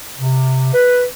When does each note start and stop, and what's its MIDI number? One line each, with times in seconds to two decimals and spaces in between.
0.18 0.74 48
0.74 1.04 71